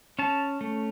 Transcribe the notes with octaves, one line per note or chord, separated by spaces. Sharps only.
C#4 A5
A3